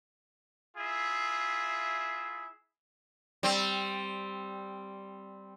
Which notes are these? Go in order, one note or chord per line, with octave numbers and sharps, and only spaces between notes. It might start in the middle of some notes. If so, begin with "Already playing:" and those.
E4 F4 G#4 E5
G3 C4